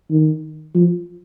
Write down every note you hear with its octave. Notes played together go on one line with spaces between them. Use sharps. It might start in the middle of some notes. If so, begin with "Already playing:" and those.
D#3
F3